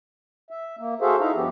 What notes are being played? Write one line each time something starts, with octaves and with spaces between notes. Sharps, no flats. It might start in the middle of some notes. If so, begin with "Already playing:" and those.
E5
A#3
F#4 G#4 A4 C5 E5 F5
D#4 E4 E5 F5 A#5
G2 F3 B3 G4